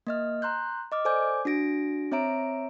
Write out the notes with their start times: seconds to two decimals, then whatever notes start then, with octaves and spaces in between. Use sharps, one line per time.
0.07 A#3 D#5 F6
0.42 A#5 C6 F#6 G6
0.92 D#5 D6 F6
1.05 A4 C5 D5 G#5 D6 G6
1.45 D4 F#4 A#6 D7
2.12 C4 C#5 E5 A#5 D7